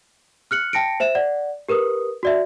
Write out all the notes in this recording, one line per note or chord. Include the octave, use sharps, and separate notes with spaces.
F6 F#6 C#7 F#7
G5 A5 A#6 C#7 D7
C5 E5 E7
D5 F#5
G4 A#4 B4 D#6
F#4 D5 E5